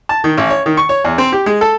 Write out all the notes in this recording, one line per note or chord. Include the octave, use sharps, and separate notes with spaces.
A5
D#3
A1
C#5
D#3
C#6
C#5
E2
C4
G4
G#3
A4